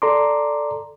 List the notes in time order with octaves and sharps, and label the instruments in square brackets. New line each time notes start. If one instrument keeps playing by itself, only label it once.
[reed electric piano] A4 D5 A#5 C6 D6